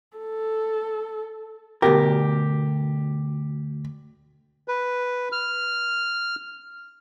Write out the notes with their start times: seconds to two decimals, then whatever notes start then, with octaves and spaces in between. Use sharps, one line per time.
0.18 A4
1.82 D2 B2 G4 A#4
4.68 B4
5.32 F6